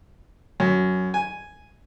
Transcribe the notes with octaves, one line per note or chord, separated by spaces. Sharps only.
F#2
G#5